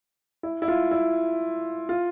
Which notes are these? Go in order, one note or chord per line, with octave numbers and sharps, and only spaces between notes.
E4
E4
F4
E4
F4